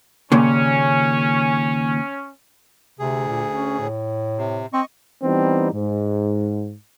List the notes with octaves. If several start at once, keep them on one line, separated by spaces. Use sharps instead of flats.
D#2 A#2 C#3 C#4
D2 C3 G#4
A#2
C#4
A2
C3
C4 D#5 C#6
E3 G3 B3 C4 D#4
G#2